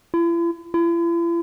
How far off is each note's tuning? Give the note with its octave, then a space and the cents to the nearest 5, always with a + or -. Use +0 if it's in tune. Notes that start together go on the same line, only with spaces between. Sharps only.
E4 +45
E4 +45